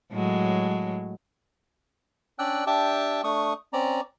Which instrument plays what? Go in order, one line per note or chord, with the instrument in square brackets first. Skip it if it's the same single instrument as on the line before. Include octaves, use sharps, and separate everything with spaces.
[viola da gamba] A2 F#3 G#3
[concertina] C#4 D4 D5 G5 E6 F#6
D4 G4 E5 G5 A5
A3 D4 C#6 D#6
C4 C#4 D5 A#5